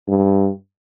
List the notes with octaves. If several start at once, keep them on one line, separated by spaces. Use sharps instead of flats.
G2